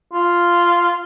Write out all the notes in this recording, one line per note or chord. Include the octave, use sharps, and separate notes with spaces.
F4